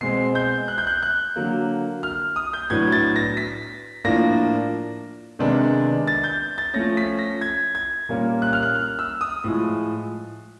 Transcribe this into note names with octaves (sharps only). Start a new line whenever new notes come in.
B2 G#3 C4 C7
G6
F#6
G6
F#6
F#6
D3 F#3 A#3
F6
D#6
G6
A2 F#3 B3 D4 G#6
A6
A#6
B6
A2 F3 A#3 D4 A#6
C3 D#3 G#3 B3 D4
A6
G6
A6
F3 A3 C#4 A#6
B6
A#6
G#6
G#6
A#2 G3 A#3 C#4
F#6
F6
F#6
F6
E6
D#6
A2 F3 G#3